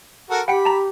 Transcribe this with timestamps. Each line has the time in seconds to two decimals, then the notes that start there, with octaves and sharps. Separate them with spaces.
0.30 F#4 A4 A#4
0.48 G4 F#5 G5 B5 C#7
0.65 A5 A#5